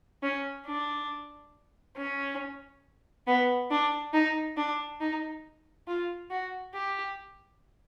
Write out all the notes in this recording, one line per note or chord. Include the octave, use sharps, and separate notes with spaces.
C#4
D4
C#4
B3
D4
D#4
D4
D#4
F4
F#4
G4